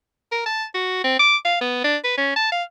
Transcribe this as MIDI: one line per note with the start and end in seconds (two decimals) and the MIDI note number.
0.32 0.42 70
0.46 0.65 81
0.74 1.04 66
1.04 1.17 60
1.19 1.37 86
1.45 1.59 77
1.61 1.82 59
1.84 1.97 62
2.04 2.14 71
2.17 2.34 61
2.36 2.51 81
2.52 2.63 77